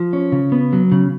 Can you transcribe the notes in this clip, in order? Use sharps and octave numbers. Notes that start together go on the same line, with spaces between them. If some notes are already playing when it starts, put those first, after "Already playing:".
Already playing: F3
C#4
C#3
B3
F#3
C#3